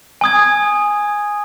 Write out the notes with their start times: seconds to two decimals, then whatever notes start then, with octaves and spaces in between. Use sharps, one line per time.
0.21 G#5 D#6 G#6